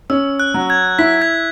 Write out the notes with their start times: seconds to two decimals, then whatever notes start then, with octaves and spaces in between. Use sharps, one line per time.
0.10 C#4 E6
0.40 F#6
0.54 F#3
0.70 G#6
0.99 E4 B6
1.22 G#6